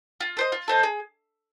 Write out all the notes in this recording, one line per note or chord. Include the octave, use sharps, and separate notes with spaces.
F4
A4 C5 D#5
F4
A4 C5 D#5
G#4